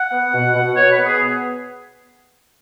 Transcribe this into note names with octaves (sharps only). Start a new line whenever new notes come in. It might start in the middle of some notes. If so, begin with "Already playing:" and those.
Already playing: F#5
B3
B2
B2
B2 C#5
B4
B3
G#4